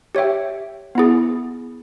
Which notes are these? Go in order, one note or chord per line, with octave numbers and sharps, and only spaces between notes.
G4 C#5 E5 G5
B3 E4 G#4